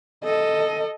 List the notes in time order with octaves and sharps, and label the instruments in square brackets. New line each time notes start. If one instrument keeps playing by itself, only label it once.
[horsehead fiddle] A4 D#5